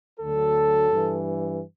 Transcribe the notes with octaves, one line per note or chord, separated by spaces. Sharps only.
D2 D3 F#3 A4
G2 E3